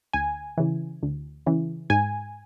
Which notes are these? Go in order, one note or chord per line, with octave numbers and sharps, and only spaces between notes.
D2 G#5
C#3 E3
D2
C#3 E3
G#2 G#5